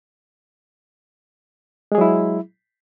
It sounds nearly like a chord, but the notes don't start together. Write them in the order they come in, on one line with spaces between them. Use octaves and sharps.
G#3 G#4 F#3 E4